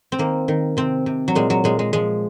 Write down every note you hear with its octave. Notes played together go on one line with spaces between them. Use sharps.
C4
D#3 A#3
D#3
C3 C4
C3
F#3
A#2 G#3
F#3
A#2 G#3
G#3
F3 G#3